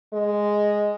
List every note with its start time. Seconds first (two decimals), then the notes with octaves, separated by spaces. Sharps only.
0.13 G#3